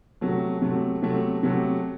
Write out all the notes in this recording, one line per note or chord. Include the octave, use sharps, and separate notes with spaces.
C3 F#3 A3
C3 F#3 A3
C3 F#3 A3
C3 F#3 A3